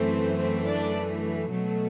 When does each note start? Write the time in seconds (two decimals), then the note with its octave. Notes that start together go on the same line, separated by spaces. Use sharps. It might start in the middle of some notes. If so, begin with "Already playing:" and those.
Already playing: F#2 E3 A3 C4 C5
0.38 C4 C5
0.66 D4 D5
1.51 B2 F#3 A3